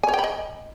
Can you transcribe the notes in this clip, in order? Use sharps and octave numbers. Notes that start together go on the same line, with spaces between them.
G#5
C#5
G5
B5
D#5